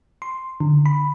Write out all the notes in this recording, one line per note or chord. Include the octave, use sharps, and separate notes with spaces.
C6
D3
B5